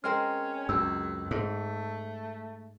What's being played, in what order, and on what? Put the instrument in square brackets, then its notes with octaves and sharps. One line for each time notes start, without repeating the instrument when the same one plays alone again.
[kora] G#3 C4 A#4 [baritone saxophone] C#4 [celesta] F6
[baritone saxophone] C#2 [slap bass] F#2 [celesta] E6
[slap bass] G#2 [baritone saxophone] A3